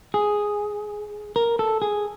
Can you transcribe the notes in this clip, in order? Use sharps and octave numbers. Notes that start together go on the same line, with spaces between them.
G#4
A#4
A4
G#4